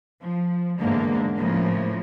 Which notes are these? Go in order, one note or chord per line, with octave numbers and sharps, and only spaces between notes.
F3
E2 G#2 D3 A#3
A2 C#3 F3 A#3